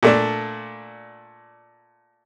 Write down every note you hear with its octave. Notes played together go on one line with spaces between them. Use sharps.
A#2 A3 D4